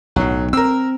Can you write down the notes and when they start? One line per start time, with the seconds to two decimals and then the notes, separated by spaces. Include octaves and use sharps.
0.16 B1 A2 F#3
0.53 C4 A#4 E6